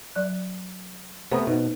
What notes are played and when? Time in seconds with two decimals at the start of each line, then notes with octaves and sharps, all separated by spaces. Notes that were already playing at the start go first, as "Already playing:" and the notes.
0.16 F#3 D5 F#6
1.32 C3 A3 B3 C5 A#5 D#6
1.47 B2 D#4